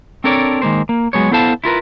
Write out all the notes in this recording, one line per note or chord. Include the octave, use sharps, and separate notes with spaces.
C4 D4 A4 A#4 C#5 D5
D#3 G#3 A#3 C5
A#3
F#3 G#3 B3 C#5
B3 E4 A4 C5 F5 A5
E4 F4 A#4 B4